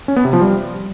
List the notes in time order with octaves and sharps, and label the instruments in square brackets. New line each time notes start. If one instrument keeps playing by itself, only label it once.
[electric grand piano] C#4
B3
C3
F3
G3